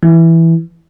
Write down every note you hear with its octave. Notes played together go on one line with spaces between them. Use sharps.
E3